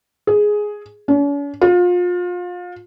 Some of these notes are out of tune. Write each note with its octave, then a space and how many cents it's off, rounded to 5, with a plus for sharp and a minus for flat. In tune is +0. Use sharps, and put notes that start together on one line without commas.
G#4 +5
C#4 +45
F4 +30